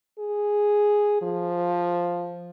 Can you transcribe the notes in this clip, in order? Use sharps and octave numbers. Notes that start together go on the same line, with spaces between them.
G#4
F3